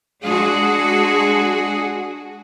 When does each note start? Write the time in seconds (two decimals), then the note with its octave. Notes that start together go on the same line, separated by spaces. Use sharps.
0.23 G#3 D4 F#4 G#4